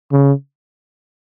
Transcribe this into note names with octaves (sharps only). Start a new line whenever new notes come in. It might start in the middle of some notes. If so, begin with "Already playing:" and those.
C#3